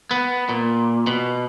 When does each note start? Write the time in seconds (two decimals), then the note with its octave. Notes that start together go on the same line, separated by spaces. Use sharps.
0.11 B3
0.49 A#2
1.07 B2